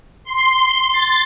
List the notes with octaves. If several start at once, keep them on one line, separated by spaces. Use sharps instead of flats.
C6
A6